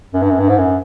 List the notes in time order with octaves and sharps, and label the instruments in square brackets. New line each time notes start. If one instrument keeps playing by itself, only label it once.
[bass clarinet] F#2
G2
F#2
G2
G#2
F#2